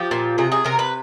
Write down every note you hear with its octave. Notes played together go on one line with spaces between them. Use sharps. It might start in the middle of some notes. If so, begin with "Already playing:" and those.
Already playing: F3 G4
A#2
C3 G#4
G#4
C3 A#4
B4